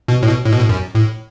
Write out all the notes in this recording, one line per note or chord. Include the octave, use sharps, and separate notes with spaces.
B2
A2
B2
A2
B2
A2
F#2
A2